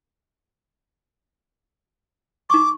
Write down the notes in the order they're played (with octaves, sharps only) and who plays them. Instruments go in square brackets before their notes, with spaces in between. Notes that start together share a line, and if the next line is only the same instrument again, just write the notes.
[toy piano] D#4 C#6 [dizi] D6